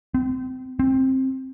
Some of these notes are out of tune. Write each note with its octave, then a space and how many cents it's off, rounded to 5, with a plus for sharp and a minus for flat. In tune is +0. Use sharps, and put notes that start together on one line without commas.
C4 -30
C4 +15